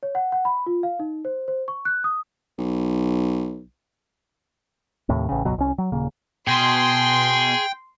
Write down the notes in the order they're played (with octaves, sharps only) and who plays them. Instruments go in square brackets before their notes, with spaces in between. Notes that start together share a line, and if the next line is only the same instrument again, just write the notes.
[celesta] C#5
F#5
F#5
B5
F4
F5
D#4
C5
C5
C#6
F#6
D#6
[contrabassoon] B1
[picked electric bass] D#2 A2 C3
A1 C#3
G1 C#2 B2 F#3
C2 C#4
F#3
D#1 C#3 A#3
[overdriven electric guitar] B2 [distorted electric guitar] G#4 [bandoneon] G5 [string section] C6